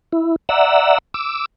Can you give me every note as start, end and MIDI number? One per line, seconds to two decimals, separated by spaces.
0.13 0.36 64
0.49 0.98 74
0.49 0.98 76
0.49 0.98 78
0.49 0.98 82
0.49 0.98 88
1.14 1.46 86
1.14 1.46 88